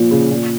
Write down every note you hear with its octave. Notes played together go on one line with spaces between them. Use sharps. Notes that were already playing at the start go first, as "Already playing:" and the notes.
Already playing: A#2 F3
C#3
A#2